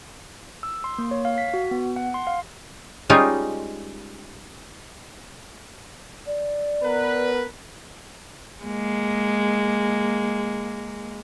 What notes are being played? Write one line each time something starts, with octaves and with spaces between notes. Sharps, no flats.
E6
C6
A#3
C#5
F5
B6
F#4
B3
F#5
C6
F5
G3 G#3 C#4 D#4 F4 G4
D5
B3 A#4 B4
G#3 A#3